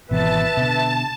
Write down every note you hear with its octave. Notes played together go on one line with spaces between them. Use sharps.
G#1 B2 E3 B4 E5 A5
B2 D3